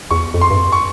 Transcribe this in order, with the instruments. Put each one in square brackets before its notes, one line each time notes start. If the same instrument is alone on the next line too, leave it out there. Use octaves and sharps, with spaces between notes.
[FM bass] E2 [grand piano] C#6
[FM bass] F2
[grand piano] C6
[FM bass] G2
F2
[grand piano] C#6